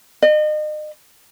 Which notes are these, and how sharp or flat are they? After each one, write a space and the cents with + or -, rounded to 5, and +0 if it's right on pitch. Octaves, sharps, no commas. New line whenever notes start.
D#5 -35